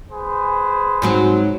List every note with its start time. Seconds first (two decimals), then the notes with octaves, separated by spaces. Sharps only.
0.11 G#4 B4 C5
1.02 G#2 F#3 C4